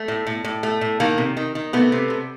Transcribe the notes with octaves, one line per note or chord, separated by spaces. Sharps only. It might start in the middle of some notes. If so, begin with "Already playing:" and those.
Already playing: A3
A2
A2
A2
A3
A2
D#3 A#3
C3
D#3
D#3
C3 A3 B3
C3
C3